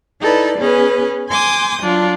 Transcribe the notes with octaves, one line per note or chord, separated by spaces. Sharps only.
D#4 E4 A4 B4 D5
B3 C#4 G#4 B4
G#5 C6 D6 D#6 G6
F#3 D4 F4